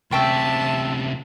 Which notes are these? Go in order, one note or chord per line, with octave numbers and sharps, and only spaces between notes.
D2 C3 E5 G5 A5 C#6